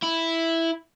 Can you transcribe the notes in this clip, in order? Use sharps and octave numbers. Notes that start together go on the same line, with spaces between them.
E4